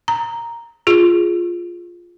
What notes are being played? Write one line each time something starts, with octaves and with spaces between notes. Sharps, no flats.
A#5
F4 G#4